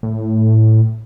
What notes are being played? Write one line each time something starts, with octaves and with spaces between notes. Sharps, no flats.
A2